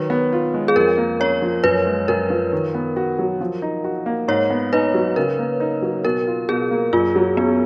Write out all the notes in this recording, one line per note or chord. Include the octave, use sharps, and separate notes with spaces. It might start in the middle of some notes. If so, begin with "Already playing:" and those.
Already playing: D#3 F#3 B4 C#5
B3
F4
G#3
G#4
F2 A#4
A#3
C#4 C#5
F3
F#2 B4
G#3
F#2 A#4
F3
D#3
B3
F#4
F#3
F3
D#4
F#4
A#3
G#2 C#5
B3
D#4 B4
F#3
C#3 A#4
A#3
D#4
F#3
B2 A#4
F4
B2 G#4
A#3
F#2 F4
F#3
B3 C#4